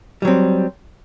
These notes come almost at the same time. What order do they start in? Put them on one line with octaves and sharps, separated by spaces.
G3 F#3 C4